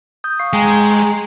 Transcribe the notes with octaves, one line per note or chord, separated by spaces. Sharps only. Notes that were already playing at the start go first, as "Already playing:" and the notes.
D#6 G6
F5 C#6 C7
G#3 G5 G#5 A#5